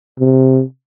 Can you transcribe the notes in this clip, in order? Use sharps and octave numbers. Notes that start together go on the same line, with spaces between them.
C3